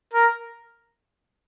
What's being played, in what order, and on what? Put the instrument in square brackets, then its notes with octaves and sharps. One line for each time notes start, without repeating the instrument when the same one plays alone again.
[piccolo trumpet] A#4